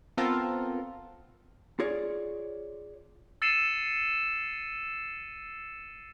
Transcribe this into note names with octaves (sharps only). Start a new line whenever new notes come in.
B3 C4 F4 A4 A#4
F4 G#4 C#5 D5
E6 A6 C7 C#7 D#7 E7